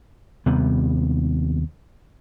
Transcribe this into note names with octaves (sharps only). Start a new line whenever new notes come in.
D#2 C3 G3 B3